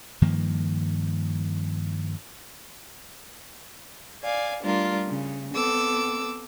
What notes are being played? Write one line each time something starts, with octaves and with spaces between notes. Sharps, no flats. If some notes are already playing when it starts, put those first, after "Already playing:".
G2 D#3 F3 A#3
D5 F5 G#5
G3 A3 D4 F4 A#4
C#3
B3 C4 A4 D6 E6